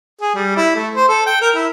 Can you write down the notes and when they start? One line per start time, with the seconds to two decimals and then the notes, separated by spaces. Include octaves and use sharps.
0.22 G#4
0.35 G3
0.57 E4
0.75 A3
0.95 C5
1.09 A4
1.27 G5
1.42 A#4
1.56 E4